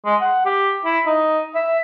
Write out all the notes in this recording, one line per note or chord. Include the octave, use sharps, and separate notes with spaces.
G#3
F#5
G4
E4
D#4
E5